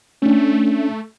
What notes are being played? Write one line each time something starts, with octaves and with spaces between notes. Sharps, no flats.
A3 C#4 D4